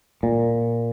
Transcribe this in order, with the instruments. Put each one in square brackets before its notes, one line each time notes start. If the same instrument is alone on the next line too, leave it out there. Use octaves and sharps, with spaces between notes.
[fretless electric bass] A#2